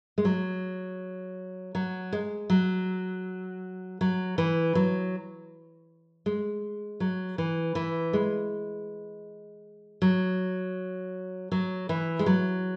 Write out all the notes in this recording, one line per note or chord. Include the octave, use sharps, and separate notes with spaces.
G#3
F#3
F#3
G#3
F#3
F#3
E3
F#3
G#3
F#3
E3
E3
G#3
F#3
F#3
E3
G#3
F#3